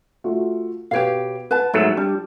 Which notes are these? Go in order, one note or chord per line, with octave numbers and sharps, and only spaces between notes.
A3 F4 F#4
B2 G4 B4 C#5 F5 D7
B4 F#5 A5
G#2 F#3 A3 A4
G3 D4